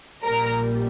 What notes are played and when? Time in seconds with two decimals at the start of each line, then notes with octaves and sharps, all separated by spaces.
0.24 A#1 A#2 G3 A#4